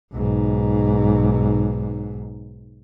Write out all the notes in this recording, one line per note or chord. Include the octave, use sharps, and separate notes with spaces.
B1 G#2